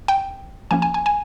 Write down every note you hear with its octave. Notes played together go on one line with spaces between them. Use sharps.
G5
F3 A#3 C#4 G#5
G#5
G#5
G#5